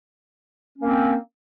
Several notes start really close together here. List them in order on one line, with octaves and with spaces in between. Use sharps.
C#4 A#3 C4